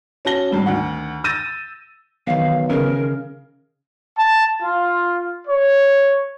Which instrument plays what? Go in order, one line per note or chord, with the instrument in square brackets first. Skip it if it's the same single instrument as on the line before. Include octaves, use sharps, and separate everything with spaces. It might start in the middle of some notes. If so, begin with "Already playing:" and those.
[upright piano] C#4 F#4 A5 A#6 G7
G#1 G2 C4
D2 D#3 F#5
E6 G6 A6 A#6 D#7
[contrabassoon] B1 [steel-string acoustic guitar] D#3 E3 [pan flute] F5
[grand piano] C#3 [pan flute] A#4
[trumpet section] A5
F4
C#5